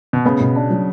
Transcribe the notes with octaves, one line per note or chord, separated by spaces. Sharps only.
B2
C#3 B3
B2
D4
F#3